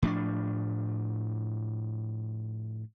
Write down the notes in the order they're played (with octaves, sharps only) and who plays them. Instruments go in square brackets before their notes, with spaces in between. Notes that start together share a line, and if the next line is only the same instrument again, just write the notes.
[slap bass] A2 F3 C#4 D4